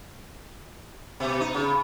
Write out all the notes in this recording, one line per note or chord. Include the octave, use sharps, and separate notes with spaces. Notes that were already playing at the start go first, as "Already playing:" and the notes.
B2
D#4
C#3